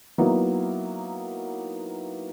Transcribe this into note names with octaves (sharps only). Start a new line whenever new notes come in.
F#3 A#3 B3 D#4 E4